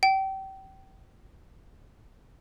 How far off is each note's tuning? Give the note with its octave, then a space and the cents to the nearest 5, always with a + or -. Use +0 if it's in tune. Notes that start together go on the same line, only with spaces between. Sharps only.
G5 -30